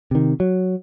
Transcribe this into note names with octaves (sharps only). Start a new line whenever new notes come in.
C3 D#3
F#3